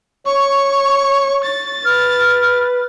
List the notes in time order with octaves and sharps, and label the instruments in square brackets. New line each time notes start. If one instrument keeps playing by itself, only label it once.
[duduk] C#5 [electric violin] C#6
[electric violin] A6
[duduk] B4 [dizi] F6